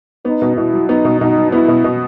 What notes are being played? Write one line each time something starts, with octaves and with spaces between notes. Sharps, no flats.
B3 D#4
B2
B2 E4
F#3
B3 D#4
B2
B2 D#4
F#3
B3 E4
B2
B2